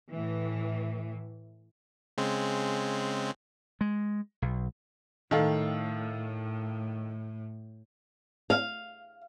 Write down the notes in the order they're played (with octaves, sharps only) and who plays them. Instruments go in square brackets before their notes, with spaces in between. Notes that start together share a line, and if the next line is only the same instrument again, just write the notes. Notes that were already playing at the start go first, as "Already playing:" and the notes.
[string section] A2 E3
[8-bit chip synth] C#3 G#3 C4
[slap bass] G#3
B1
[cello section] A2 [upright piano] D#3 A4 F5
[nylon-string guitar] F5